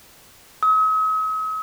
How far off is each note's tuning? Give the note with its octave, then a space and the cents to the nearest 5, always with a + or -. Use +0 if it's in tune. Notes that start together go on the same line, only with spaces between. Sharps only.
D#6 +45